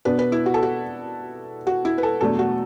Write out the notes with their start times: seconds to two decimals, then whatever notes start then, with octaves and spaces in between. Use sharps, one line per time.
0.05 B2 B3 D4 B4
0.19 B4
0.32 E4
0.46 F#4
0.54 A4
0.63 F#4
1.67 F#4
1.85 E4
1.98 B4
2.03 A4
2.21 E2 B2 F#3 A3 D4 A4
2.39 F#4